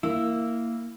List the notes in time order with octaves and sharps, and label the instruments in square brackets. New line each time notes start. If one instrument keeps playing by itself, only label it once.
[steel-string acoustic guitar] A#3 [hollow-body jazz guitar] E4